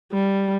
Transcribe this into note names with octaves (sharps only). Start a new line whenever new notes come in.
G3